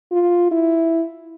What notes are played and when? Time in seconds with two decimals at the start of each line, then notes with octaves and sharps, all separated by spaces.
0.12 F4
0.51 E4